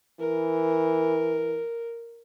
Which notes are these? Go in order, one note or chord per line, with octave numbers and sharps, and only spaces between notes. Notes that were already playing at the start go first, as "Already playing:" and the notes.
E3 A#4